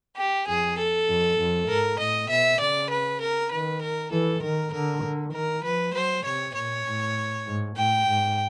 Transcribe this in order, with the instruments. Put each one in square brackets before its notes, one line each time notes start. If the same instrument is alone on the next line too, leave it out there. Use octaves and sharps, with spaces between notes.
[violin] G4
[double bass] F2 [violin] G#4
[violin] A4
[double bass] F2
F2
[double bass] G#2 [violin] A#4
[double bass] A2 [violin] D#5
[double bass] B2 [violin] E5
[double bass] C#3 [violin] D5
[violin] B4
A#4
[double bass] D#3 [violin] B4
[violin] A#4
[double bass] E3 [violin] A4
[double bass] D#3 [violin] A#4
[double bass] D3 [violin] A#4
[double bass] D3
[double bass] D#3 [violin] A#4
[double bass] F3 [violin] B4
[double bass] F#3 [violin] C5
[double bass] C3 [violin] C#5
[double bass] A#2 [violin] C#5
[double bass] A2
G#2
[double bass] A2 [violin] G5
[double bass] G#2